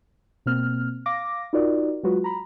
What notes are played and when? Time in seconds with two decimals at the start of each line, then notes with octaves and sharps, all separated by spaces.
0.46 B2 A#3 C4 F6
1.06 F5 D6 A#6
1.53 D#4 F4 F#4 A#4 D5
2.03 F#3 G#3 F4 F#4 B4
2.24 A#5 B5